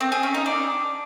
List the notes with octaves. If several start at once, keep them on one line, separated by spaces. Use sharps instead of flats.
C4
G#4
C#4
D#4
D4